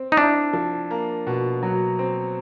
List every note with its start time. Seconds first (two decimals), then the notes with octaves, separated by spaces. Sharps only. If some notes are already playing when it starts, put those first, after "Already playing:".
Already playing: C4
0.12 D#4
0.17 D4 E4
0.53 F3
0.91 A#3
1.27 B2
1.63 F#3
1.99 C4